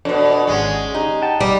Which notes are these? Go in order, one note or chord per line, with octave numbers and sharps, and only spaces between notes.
F2 B2 D4
G#1 G#3 C#4 G#4 F#5
D#4 G4
F#5 G5 A5
G#1 G3